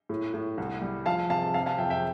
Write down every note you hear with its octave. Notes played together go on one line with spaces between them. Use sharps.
A2
A2
C2
G3
F3 F5 A5
C3 F5 A5
C3 F5 A5
F5 A5
F2 E5 G5
E5 G5